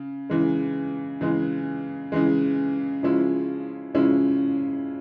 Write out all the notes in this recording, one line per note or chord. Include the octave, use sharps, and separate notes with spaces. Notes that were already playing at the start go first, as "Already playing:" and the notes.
Already playing: C#3
C#3 E3 G#3
C#3 E3 G#3
C#3 E3 G#3
C#3 F3 G#3 C#4 E4
C#3 F3 G#3 C#4 E4